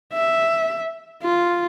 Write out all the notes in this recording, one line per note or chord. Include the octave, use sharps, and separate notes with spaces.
E5
F4